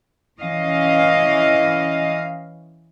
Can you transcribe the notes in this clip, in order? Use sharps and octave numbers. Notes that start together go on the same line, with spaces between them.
E3 C#4 D#5 F5